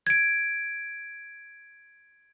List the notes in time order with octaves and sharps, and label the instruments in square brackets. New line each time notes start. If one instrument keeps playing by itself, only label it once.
[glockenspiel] G#6 D7